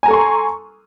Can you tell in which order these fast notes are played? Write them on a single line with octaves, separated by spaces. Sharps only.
G#5 A#5 A4 C#6 C6